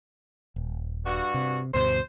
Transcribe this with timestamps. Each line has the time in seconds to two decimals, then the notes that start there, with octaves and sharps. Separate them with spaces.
0.56 D#1
1.06 G2 F#4
1.34 C3
1.74 D2 G2 B2 C5